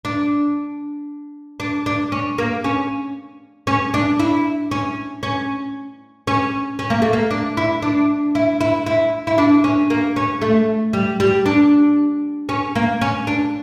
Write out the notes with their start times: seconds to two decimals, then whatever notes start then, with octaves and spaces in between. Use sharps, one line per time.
0.05 D4
1.60 D4
1.86 D4
2.12 C#4
2.38 A#3
2.64 C#4
3.67 C#4
3.94 D4
4.19 E4
4.71 C#4
5.23 C#4
6.27 C#4
6.79 C#4
6.90 A#3
7.02 A3
7.13 A#3
7.31 D4
7.57 E4
7.82 D4
8.35 E4
8.61 E4
8.86 E4
9.27 E4
9.38 D4
9.64 C#4
9.90 A#3
10.16 C#4
10.41 A3
10.93 G3
11.20 G3
11.46 D4
12.49 C#4
12.75 A#3
13.01 C#4
13.27 D4